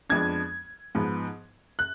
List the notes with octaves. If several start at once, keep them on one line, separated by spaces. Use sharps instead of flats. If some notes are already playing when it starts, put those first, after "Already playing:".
F2 F3 G#3 B3 D4 G#6
G#2 F3 B3
F#6